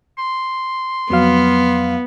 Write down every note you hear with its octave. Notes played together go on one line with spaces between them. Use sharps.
C6
F2 F#3 B3 F5